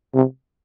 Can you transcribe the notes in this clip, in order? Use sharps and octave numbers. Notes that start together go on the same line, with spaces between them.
C3